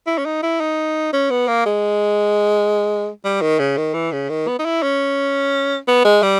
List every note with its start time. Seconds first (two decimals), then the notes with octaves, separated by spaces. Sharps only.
0.07 E4
0.18 C#4
0.26 D#4
0.43 E4
0.60 D#4
1.13 C#4
1.30 B3
1.48 A#3
1.66 G#3
3.25 G3
3.41 D#3
3.59 C#3
3.77 D#3
3.94 E3
4.12 C#3
4.29 D#3
4.48 B3
4.59 D#4
4.65 E4
4.82 C#4
5.88 B3
6.05 G#3
6.22 G3